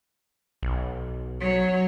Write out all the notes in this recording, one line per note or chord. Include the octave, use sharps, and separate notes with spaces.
B1
F#3 C#5